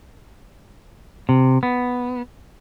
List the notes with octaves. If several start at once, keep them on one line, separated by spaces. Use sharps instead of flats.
C3
B3